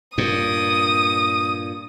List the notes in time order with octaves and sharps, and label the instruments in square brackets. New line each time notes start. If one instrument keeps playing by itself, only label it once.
[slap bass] G2 A#2 [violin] D#6